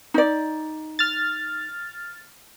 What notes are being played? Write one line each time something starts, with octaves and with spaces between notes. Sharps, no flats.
D#4 D5
F6 A6